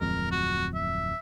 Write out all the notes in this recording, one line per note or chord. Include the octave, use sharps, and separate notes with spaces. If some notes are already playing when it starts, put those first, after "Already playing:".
D1 F2 G#3 A#4
F#4
E5